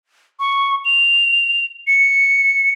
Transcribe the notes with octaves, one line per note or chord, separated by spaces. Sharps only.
C#6
F7
C#7